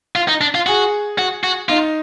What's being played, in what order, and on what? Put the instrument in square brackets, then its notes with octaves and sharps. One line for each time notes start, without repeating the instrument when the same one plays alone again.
[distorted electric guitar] F4
D#4
D4
F4
[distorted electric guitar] F#4 [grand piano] G#4
[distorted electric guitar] F#4
F#4
[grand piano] D#4 [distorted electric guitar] F4